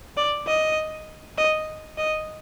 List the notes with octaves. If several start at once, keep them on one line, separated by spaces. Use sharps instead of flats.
D5
D#5
D#5
D#5